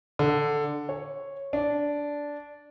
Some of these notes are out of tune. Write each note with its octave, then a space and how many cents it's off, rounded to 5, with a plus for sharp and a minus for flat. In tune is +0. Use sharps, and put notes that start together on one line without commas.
D3 +5
C#5 -5
D4 -10